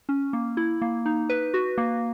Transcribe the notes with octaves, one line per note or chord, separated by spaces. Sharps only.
C#4
A#3
E4
A#3
D#4
B4
F#4
A#3